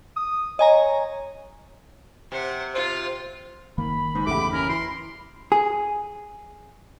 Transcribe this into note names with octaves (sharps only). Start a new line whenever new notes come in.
D#6
C#5 D#5 G#5 A#5
C3 C5 F#5
F4 C5
F#1 D#3 A#3 B5
G#2
G1 E2 C#3 A3 G4 D6
C#4 A#4
E3 C6
G#4